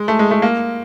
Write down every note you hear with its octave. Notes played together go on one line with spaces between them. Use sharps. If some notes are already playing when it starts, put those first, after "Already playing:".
Already playing: G#3
A3
G#3
A3
A#3